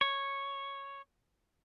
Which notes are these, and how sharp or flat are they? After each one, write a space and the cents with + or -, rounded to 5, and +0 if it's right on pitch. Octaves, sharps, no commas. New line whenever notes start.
C#5 -5